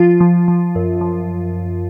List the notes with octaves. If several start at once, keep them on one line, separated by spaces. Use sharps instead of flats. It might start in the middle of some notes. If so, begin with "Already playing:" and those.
Already playing: F3 F4
F3
F3
F#2
F3